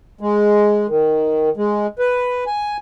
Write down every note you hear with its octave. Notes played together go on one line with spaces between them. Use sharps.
G#3
D#3
G#3
B4
G#5